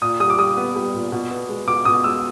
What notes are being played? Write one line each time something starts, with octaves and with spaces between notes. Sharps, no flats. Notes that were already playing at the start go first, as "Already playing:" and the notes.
A#2 D#6
G3 D#6
D6
G3 D#6
B3
G3
A#2
B2
B3
G#3
B2 D6
B2 D#6
G#3 E6